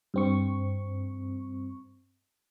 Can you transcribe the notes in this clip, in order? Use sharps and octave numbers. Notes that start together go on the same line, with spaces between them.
G2 C4 C#6